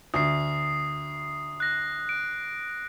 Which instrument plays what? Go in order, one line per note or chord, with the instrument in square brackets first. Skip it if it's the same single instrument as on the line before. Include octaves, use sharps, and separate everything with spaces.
[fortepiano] D2 [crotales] D#6 C7
[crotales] F#6 A#6
D7